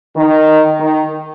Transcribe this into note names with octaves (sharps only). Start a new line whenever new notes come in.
D#3
D#3